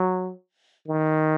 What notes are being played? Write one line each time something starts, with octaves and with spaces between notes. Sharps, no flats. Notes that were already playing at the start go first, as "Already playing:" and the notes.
Already playing: F#3
D#3